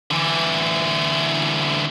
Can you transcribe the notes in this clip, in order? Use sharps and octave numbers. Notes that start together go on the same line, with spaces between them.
D3 E3